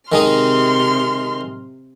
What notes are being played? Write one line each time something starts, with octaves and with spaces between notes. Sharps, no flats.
C3 D#3 G#3 D#4 C6 F6